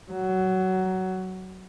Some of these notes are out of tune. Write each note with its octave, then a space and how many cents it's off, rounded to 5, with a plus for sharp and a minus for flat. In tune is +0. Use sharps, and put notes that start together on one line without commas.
F#3 +15